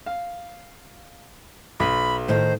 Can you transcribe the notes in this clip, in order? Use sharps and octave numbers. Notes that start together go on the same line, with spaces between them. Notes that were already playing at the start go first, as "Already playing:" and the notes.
F5
B1 B5
A2 D#3 C5